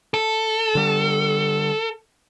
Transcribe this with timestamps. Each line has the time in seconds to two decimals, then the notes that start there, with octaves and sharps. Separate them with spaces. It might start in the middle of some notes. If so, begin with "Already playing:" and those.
0.14 A4
0.75 D3 G3